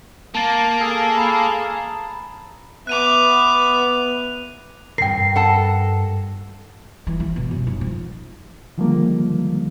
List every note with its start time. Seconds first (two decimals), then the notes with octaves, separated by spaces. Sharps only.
0.35 A#3 A5 A6 F#7
0.80 G#4 A4 F5
1.16 A#5 B5 E7
2.87 B3 E5 D6 F#6 D#7 F7
4.98 G2 B2 A#4 G5 C7
5.36 A4 F#5 A5
7.07 E3
7.20 E3
7.36 B2
7.51 F#2
7.67 D#4
7.81 F3
8.78 D3 D#3 F3 G3 G#3 A#3